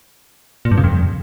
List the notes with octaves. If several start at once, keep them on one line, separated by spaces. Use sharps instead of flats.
A#2
G2
C#3
F2